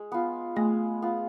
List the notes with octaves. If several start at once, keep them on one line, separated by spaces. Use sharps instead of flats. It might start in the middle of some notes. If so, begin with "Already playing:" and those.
Already playing: G#3
B3 F4
G#3 A3
B3 F4